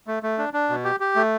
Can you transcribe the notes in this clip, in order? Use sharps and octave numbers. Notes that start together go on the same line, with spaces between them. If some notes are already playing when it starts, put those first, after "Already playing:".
A3
A3
D4
D4
B2
G4
G4
A3